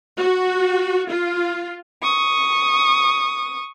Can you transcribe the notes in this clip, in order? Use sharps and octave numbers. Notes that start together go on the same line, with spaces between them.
F#4
F4
C#6 D#6